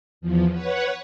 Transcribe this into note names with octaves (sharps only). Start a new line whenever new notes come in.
E2 F3
B4 C#5 F#5